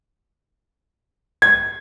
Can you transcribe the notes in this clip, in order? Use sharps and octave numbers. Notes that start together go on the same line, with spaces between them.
G#6